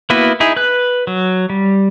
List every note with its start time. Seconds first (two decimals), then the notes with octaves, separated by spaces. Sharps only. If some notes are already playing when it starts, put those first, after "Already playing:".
0.10 A#3 B3 E4 F#4 B4
0.40 D#4 E4 G#4
0.56 B4 F#6
1.07 F#3
1.50 G3